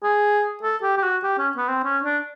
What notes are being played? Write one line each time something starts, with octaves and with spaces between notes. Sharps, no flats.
G#4
A4
G4
G4
F#4
G4
C#4
B3
C4
C#4
D4